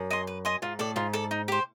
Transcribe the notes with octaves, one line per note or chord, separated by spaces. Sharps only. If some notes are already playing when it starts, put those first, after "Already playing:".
Already playing: F#2
D#5 G#5 C6
B4
D#5 G#5 C6
G#2 F4
A2 A4 D5
G#2 F4
A4 D5
D#4
G4 C5